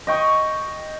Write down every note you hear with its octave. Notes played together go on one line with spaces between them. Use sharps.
D#5 G5 C#6